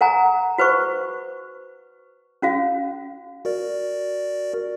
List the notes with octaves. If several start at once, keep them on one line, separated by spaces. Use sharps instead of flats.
A#4 F#5 G#5 A#5
F#4 B4 C5 C#6
C#4 F#4 F5
F#4 A#4 D5